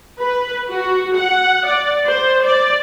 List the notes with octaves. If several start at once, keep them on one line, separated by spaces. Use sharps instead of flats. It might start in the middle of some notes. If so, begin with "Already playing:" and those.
B4
F#4
F#5
D5
C5
D5